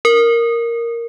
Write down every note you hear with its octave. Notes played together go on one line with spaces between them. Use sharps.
A#4